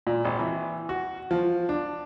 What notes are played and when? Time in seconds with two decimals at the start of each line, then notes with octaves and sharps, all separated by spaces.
0.07 A#2
0.25 G#1
0.39 E3
0.89 F#4
1.31 F3
1.69 D4